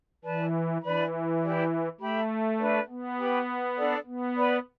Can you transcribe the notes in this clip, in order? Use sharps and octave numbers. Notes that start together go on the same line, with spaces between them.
E3 B4 D5 A5
E3 D4 B4 D5 B5
E4 G4 D5
A3 G4 E5 B5
D4 B4 D5
B3
G4 B4 G5 B5
D4 A4 D5
B3
B4 D5 B5